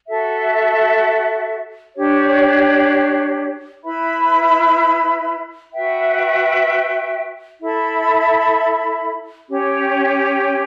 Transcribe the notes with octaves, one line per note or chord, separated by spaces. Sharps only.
F#4 A4 E5
D4 G4 C#5
E4 B4 E5 B5
F#4 B4 E5 G5
E4 A4 E5 B5
C#4 G4 C#5 G5